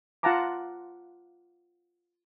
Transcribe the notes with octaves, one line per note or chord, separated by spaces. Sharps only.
F4 F5 F#5 A5 A#5 D6